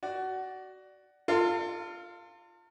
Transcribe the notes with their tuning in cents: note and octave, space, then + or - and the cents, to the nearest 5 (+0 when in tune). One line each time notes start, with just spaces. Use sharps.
F#4 +20 D5 +0
F4 +0 A4 +40 D5 +30